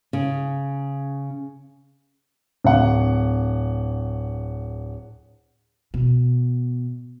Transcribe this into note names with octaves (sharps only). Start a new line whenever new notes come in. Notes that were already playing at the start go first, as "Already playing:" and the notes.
C#3
D1 F#5
B2